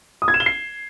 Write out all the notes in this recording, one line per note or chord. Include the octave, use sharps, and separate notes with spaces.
D#6
G#6
E7
G7
C7